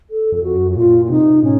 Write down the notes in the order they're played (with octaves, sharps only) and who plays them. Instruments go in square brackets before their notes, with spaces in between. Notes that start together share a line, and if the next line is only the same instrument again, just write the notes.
[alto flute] A4
[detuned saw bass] F2 [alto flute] A4
[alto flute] F#4
[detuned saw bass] F#2
[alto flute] F#4
[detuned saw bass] A#2 [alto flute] F4
[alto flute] F4
[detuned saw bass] C3 [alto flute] D#4
[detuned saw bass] A2 [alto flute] C#4